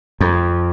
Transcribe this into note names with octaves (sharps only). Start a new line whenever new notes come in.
F2